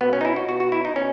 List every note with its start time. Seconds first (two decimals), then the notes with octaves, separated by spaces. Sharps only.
0.01 B2 B3
0.13 C#4
0.21 D#4
0.25 E4
0.36 F#4
0.48 B2 F#4
0.60 F#4
0.72 E4
0.85 D#4
0.96 B2 C#4